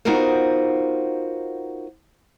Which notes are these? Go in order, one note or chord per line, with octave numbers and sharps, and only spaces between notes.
B3 D#4 F4 F#4 A#4 C5